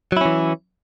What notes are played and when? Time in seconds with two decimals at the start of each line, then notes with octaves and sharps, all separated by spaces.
0.12 F#3
0.17 E4
0.21 C#4
0.25 E3